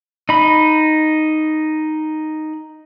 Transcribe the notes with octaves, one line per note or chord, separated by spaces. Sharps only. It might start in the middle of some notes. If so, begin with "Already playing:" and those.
D#4 B5